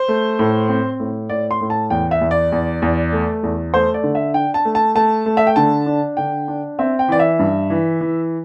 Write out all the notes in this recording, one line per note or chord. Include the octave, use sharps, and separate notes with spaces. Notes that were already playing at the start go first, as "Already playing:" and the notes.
Already playing: C5
A3
A2
C4
A2
A2 D5
C6
A2
A5
E2 G5
E5
E2
D5
E2
E2
A3
E2
A3 C5
D5
D3
E5
D4 G5
A5
A3
A5
A3 A5
A3
E5
G5
D3 A5
D4
D3 G5
D4
C4 E5
G5
E3 D5
E5
G2
E3
E3